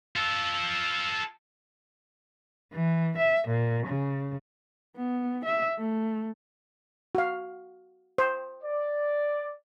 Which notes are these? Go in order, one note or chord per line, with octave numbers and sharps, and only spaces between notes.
F4 A4
E3
E5
A#2
C#3
B3
E5
A3
F#4 F5
C5
D5